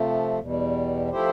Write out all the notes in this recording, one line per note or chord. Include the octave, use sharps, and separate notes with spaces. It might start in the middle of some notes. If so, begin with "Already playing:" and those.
Already playing: C3 F3 A3
E2 B2 G3
F3 A3 E4 G4 C5